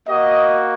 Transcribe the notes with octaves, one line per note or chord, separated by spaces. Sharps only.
A#3 F#4 D#5